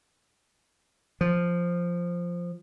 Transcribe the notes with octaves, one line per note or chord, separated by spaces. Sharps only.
F3